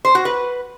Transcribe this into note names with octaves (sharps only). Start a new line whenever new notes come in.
C5
F#4
B4